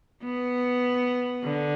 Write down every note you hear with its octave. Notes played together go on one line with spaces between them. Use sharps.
B3
D3